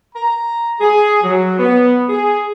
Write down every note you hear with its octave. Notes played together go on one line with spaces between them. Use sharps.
A#5
G#4
F#3
B3
G#4